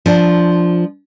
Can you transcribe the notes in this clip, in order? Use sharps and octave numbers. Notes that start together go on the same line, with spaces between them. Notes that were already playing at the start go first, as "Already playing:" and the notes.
F3 D4